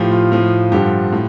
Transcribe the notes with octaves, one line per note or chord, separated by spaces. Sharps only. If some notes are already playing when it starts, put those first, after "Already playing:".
Already playing: A2 F3 G4
F4
A2 F3
G2 D3 F3 G4
A2